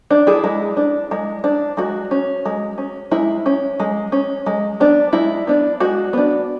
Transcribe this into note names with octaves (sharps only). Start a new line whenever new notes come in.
D4
E4 G#4
G#3
D4
G#3
D4
G#3 F#4
C#4
G#3
C#4
G#3 E4
C#4
G#3
C#4
G#3
B3 D4
G#3 E4
B3 D4
G#3 F#4
B3 D4